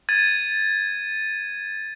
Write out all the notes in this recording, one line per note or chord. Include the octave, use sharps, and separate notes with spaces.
G#6 A6 D#7